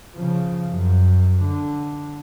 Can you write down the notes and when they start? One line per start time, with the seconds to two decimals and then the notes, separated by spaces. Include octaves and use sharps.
0.15 C#3 F3
0.70 F#2
1.43 D3